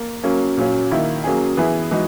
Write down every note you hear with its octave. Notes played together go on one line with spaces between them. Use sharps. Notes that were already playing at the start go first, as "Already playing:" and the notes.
Already playing: A#3
F#3 A#3 C#4
A#2 F#3 C#4
D#3 A#3 E4
F#3 A#3 C#4 G#4
E3 B3 E4 G#4
E3 G#3 D#4 F#4